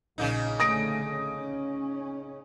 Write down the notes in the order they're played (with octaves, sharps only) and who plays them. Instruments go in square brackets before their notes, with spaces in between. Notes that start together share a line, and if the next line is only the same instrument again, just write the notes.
[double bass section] A#1 [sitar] C#3 A#3 D#4
[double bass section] D3 A3 C#4 [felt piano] D#6 A#6 D7
[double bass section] C#4